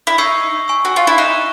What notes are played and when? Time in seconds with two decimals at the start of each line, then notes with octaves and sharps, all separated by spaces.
0.07 E4
0.18 D#4 C#6 E6 G#6 C7
0.68 G#5 C#6 E6
0.85 F#4
0.96 F4
1.07 E4
1.18 D#4 F#6 B6 E7 G7